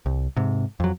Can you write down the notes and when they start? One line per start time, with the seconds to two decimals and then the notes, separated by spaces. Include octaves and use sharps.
0.06 C2
0.37 G#2 C3
0.80 F2 F#3